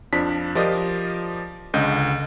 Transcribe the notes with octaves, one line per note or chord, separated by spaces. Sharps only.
F2 F3 D4 B6
F3 F4 G4 A#4 D5 D#5
C#2 D3 D#5 G6